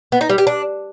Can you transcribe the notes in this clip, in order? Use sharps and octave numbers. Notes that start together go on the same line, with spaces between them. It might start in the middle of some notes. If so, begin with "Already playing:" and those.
B3
D#4
G3
G4
D4